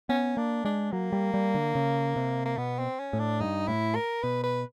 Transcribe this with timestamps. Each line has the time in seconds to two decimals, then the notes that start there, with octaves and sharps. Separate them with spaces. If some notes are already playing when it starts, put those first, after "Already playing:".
0.09 B3 C#4
0.37 A#3 D4
0.65 G#3 D4
0.92 F#3 A#3
1.12 G3
1.34 G3
1.54 D3
1.75 C#3
2.16 C3
2.45 A#3
2.58 B2 B3
2.79 C4
3.00 C#4
3.13 A2
3.19 D4
3.40 G2 D#4
3.68 A2 E4
3.95 A#4
4.23 B2 B4
4.44 B4